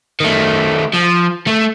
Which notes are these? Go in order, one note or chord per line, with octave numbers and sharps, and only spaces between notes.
D#3 A3
F3
A3